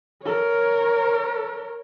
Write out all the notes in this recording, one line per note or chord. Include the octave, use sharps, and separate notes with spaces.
A#4 C#5